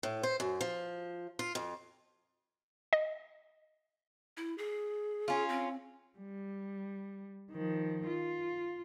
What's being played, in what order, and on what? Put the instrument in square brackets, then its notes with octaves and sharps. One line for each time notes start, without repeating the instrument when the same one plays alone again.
[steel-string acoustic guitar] A2
C5
F#2
F3
F4
F2
[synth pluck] D#5
[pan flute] E4
G#4
[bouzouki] C#4 F4
[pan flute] C4
[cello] G3
D#3 F3
F4